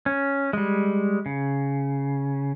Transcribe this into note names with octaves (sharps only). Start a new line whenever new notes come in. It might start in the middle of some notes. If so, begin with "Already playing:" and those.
C#4
G3 G#3
C#3